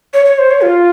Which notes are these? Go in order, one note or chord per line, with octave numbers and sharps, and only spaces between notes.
C#5
C#5
C5
C#5
F4